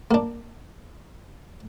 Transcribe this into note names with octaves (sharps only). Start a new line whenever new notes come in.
A#3 D4